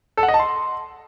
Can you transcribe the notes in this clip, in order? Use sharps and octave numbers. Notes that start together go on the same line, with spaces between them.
A4
F#5
D#5
A5
C6